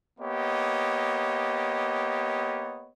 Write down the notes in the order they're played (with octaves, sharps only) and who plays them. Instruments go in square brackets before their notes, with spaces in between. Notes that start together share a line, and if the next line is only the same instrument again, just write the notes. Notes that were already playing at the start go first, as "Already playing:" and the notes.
[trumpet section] A#3 B3 G4 C#5 D#5